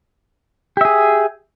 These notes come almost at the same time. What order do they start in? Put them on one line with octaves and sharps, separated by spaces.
G4 E5 G#4